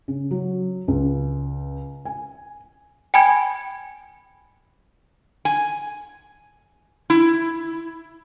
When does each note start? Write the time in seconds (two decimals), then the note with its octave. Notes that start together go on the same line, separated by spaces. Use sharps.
0.08 C#3
0.31 F#3
0.88 C#2
2.05 G#5
3.14 G5 G#5 B5 G#6
5.45 G#5
7.10 E4